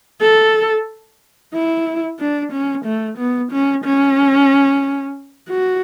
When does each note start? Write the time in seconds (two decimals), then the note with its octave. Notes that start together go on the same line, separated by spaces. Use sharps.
0.21 A4
1.54 E4
2.20 D4
2.52 C#4
2.85 A3
3.18 B3
3.52 C#4
3.85 C#4
5.50 F#4